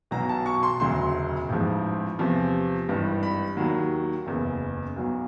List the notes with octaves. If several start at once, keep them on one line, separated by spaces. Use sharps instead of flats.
B1 B2 F#3 A#5
A5
C#6
C6
E1 D2 C#3 F#3 C6
A1 G#2 F3
E2 C3 F3
G#1 G2 E3 G3
B5
D#2 D#3 F#3
F#1 E2 C#3
B1 B2 F#3